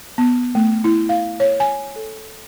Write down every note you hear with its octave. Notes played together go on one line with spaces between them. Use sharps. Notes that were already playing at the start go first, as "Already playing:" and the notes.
B3
A3
E4
F5
C#5
G#5
A4